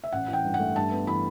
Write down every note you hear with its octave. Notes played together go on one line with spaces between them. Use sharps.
E5
A1 F#5
E3 G5
G2
F#5
A3
G2 A5
B3
E3 B5